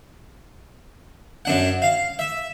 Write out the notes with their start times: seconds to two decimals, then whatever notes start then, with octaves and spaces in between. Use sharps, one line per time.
1.45 F#2 D4 F#5
1.82 F5
2.19 E5